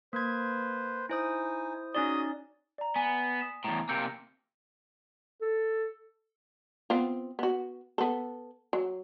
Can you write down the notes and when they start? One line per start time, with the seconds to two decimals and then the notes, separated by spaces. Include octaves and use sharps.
0.13 A#3 B4 C5 G#6
1.09 D#4 E4 C5 G#5 D#6
1.95 C#4 D#4 F#4 G#4 D5 D#5 D#6
2.78 D5 A#5
2.96 B3 G#5
3.40 D#6 B6 E7
3.64 E2 A2 A#5
3.89 C3 A#3 E6 G6 C#7
5.42 A4
6.90 B3 C4 F4
7.39 B3 F#4
7.98 B3 A4
8.73 F#3